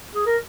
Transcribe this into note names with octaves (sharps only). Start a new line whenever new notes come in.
G#4
A#4